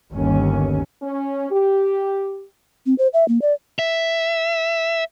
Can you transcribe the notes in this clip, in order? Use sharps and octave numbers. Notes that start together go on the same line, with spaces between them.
G1 D#2 C#4
C#4
G4
C4
C5
E5
A#3
D5
E5